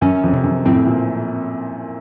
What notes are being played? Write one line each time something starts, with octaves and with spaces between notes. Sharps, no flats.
F#2 C#4
F2
C3
F#2
F2 A2 C4
A#2